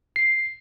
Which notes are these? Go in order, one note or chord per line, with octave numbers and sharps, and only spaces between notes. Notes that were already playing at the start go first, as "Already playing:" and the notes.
C7